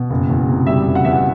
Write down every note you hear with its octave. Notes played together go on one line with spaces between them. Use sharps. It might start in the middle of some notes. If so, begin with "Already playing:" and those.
Already playing: B2
F#1
E2
C3
G3 E5
F#1
F#5
E2 E5
F#5